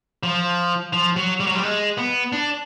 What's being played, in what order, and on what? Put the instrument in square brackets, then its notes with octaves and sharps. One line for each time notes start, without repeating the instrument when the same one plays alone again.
[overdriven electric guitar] F3
F3
F#3
G3
F#3
G3
G#3
B3
D4